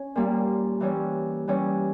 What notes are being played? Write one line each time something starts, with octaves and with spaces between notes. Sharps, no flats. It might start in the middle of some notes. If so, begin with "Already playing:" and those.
Already playing: C#4
A#2 G3 A#3
E3 G3 C#4
E3 G3 C#4